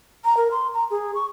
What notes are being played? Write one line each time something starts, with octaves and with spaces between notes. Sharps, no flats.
A#5
A#4
C6
A#5
G#4
C#6